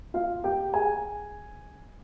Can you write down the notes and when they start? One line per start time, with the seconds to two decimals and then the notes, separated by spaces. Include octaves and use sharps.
0.14 F4 F5
0.44 G4 G5
0.73 G#4 G#5